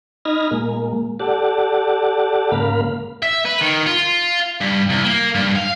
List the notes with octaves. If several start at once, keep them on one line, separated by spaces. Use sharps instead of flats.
D#4 D#5 B5 F6 G#6 A#6
A#2 G#3 A#3
G4 A4 D5 F#5 A5
G#2 C#3 A#3 A#4 F5 B5
E5
B4
D#3
F4
G2
C2
A#3
G2
F5